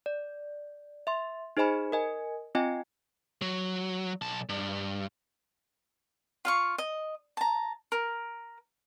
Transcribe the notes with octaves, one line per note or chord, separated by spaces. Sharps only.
D5
E5 C6
D#4 G#4 C5 D#5 G#5 B5
A#4 D#5 G#5
C4 F4 D#5 G5 G#5
F#3
B1 A5
G2
F4 F5 C#6
D#5
A5 A#5
A#4